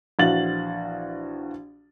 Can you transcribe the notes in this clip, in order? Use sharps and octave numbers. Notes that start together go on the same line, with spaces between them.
A#1 E3 F#4 F5 A6 F#7